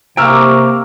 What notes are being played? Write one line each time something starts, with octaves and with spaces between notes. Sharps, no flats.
C3 A#3 G5 A#5 C#6 D6 E6 F6